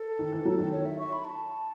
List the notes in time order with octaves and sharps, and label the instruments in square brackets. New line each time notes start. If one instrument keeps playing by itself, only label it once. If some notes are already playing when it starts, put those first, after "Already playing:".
Already playing: [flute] A4
[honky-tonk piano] D#3
E3
F#3
D#3
[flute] C#5
E5
C#6
B5
A5